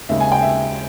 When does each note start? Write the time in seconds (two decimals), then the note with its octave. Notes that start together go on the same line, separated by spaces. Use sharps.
0.09 D#2 C#3 G#3 E5
0.20 G#5
0.32 G5
0.42 E5